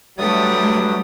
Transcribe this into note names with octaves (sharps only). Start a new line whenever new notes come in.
G2 F#3 G3 A3 G4 D#6